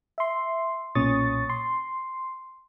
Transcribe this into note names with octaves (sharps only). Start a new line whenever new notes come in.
E5 C6
B1 A#2 C#4 C#6 D#6 A6
C6